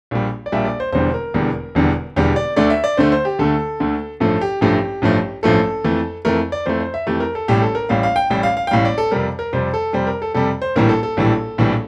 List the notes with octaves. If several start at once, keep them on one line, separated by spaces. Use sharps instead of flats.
A#1 A#2 G3
D5
A#1 A#2 G3 E5
D5
C5
E1 E2 D3 G3 C5
A#4
E1 E2 D3 G3
E1 E2 D3 G3
E1 E2 D3 G3 G4
D5
D2 D3 A3 D5
E5
D5
D2 D3 A3 C5
C5
G4
D2 D3 A3 A4
D2 D3 A3
A1 G2 F3 A3 A4
G4
A1 G2 F3 A3 G4
A1 G2 F3 A3
A1 G2 F3 A3 A4
F2 E3 A3
F2 E3 A3 A#4
D5
F2 E3 A3 C5
C5
E5
F2 E3 A3 G4
A#4
A4
A1 A2 G3 G4
A4
A#4
A1 A2 G3 F5
F5
G5
A1 A2 G3 G5
F5
F5
G5
A1 A2 G3 F5
D5
A4
F2 C3 G3 A#4
A#4
F2 C3 G3 C5
A4
F2 C3 G3 C5
A#4
A4
F2 C3 G3 A4
C5
A#1 A2 E3 G3 A#4
A4
A4
A#1 A2 E3 G3
A#1 A2 E3 G3